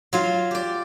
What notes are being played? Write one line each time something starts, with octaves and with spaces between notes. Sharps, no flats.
F#3 F4 F5
G4 D5